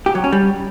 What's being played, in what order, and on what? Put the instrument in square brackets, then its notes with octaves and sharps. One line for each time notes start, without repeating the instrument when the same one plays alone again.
[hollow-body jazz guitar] G4
F#3
C#4
G3